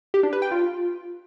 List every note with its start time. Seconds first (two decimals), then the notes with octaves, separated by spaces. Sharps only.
0.14 G4
0.23 D4
0.33 B4
0.42 G5
0.51 F4